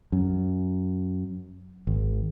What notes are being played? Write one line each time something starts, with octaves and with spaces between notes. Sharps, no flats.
F#2
G#1